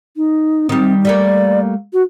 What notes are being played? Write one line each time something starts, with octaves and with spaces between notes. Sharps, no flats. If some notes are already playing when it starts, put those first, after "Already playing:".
D#4
D#3 G3 C4
G3 A3 A#3 D5
F#4